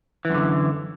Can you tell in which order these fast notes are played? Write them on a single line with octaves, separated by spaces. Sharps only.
E3 F#2 D3